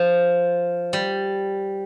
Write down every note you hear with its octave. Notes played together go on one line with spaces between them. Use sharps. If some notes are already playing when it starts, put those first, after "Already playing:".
Already playing: F3
G3